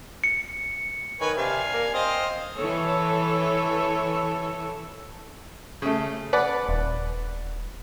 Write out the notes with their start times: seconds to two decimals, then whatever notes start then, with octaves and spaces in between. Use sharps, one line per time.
0.24 C#7
1.21 D#3 B4 C#5 G#5
1.37 C3 D4 F5 G#5
1.74 A#3
1.94 C4 C5 D#5 F5
2.56 E3 A4 C#5
5.82 C#3 A3
6.33 B4 D5 F#5
6.69 D#1